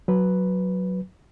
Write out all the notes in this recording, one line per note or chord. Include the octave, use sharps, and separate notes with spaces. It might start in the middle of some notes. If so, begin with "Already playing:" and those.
F#3 B4